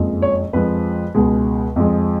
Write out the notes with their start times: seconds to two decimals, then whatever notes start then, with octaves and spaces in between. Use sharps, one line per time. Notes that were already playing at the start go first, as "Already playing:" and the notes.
Already playing: F#1 F2 F3 G#3
0.22 C#5
0.53 F2 F3 G#3 B4
1.15 C#2 B2 G#3
1.76 F2 F3 G#3